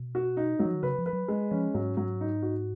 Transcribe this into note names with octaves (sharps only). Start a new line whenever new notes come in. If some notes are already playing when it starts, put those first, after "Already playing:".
Already playing: B2
F#4
D#4
F#3
F3
D#3
C#3 B4
F3
B4
F#3
G#3
F3 C#4
G#2 F#3
F#3
D#4
F#4